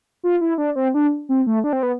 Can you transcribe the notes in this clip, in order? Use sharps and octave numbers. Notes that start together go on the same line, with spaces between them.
F4
E4
D4
C4
D4
C4
A3
D4
C4
B3